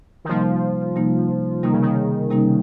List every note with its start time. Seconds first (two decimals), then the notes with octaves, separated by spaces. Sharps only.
0.25 D#3
0.29 C3 F3 G3 A#3 D#4
0.96 C3 G3 A#3 D#4
1.63 C3 D#3 G3 A#3 D#4
1.73 C#3
1.82 D#3
2.30 C3 G3 A#3 D#4